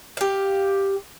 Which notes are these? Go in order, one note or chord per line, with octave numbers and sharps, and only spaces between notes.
G4 F5